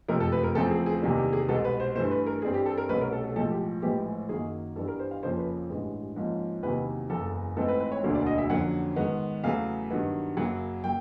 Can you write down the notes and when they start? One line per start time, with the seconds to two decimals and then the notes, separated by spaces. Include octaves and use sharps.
0.08 F#1 F2 C3 F3 A3 A#4
0.20 A4
0.32 B4
0.43 A#4
0.55 E2 C#3 F3 A3 C4 A4
0.71 G#4
0.86 G#4
1.02 E2 C3 D#3 G3 A#3
1.18 G4
1.33 G#4
1.49 C2 B2 G#3 A4
1.65 B4
1.80 C5
1.96 G2 E3 A3 C5
2.11 B4
2.26 A#4
2.42 G2 E3 G3 C4 G#4
2.54 G4
2.66 A4
2.78 A#4
2.89 C2 B2 F#3 A3 C#4 B4
3.01 A#4
3.12 A4
3.24 A4
3.36 B1 A2 F3 G#3 A4
3.51 G4
3.82 A#1 A2 E3 G#3 G4
4.29 F#2 D#3 F#3 A#3 G#4
4.76 G2 E3 G3 B3 A4
4.88 A#4
4.99 C5
5.11 F5
5.23 F2 C#3 F3 A#3 C#4 C5
5.38 B4
5.69 A1 G2 E3 G#3
6.16 G#2 F3 A#3 C#4
6.63 E2 C3 D#3 F#3 A#3 B4
7.10 F#1 E2 C#3 A4
7.57 G#2 E3 A3 C4 A4
7.68 B4
7.80 B4
7.92 C#5
8.03 E1 D2 D3 F#3 A#3
8.15 D5
8.27 D#5
8.38 E5
8.50 F2 D3 F#3 A#3 C#4 F#5
8.96 G#2 D#3 G#3 B3
9.43 E2 C#3 F#3 A3 F5
9.91 G2 D#3 F#3 B3
10.37 F#2 C#3 F#3 A#3 F#5
10.84 F#3 A#3 G5